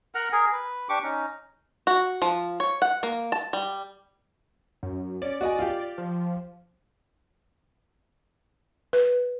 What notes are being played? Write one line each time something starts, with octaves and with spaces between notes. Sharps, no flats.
A#4 F#5 A#5
G#4 A#4 G#5
B4
D4 G4 C#6 D6
C#4 D#4
F#4
F3
C#5
F#5
A#3
A5
G3
F#2
C#4 D5
F#4 D#5 G#5
F4 G4
F3
B4